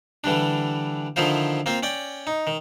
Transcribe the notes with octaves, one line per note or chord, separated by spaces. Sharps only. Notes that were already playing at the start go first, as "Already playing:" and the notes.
D3 E3 G3 D4
D3 D#3 F3 E4 F4 C5
A#3 C4 F4 C5
C#4 D5 G5
D#4
D#3